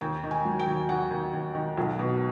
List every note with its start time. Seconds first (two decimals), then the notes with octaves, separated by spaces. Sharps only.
0.01 D#2 G5
0.24 D#3
0.31 G#5
0.45 F#3
0.59 G5
0.67 D#2
0.89 D#2 F#5
1.11 D#2
1.34 D#2
1.55 D#3
1.77 B1
1.99 B2